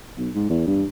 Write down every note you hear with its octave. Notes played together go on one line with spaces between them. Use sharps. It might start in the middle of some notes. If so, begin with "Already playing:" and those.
B1
G#2
E2
G2